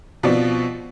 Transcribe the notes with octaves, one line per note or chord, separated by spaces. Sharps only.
B2 F3 B3 C4 D5